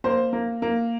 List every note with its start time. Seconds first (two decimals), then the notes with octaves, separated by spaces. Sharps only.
0.04 A#3 C5
0.33 A#3
0.62 A#3